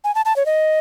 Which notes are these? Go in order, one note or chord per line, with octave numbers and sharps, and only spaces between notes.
G#5
A5
A5
C#5
D#5